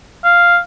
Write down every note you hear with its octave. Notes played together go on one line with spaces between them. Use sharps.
F5